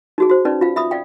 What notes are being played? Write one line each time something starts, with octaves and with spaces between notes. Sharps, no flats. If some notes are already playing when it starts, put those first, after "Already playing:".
D#4 F#4 G#4
F#4 C5
C#4 D#4 B4 D5
F4 F5
E5 B5 D#6
D5 F5 G5